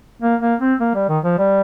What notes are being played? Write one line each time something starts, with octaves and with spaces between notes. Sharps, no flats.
A#3
A#3
C4
A#3
G3
D#3
F3
G3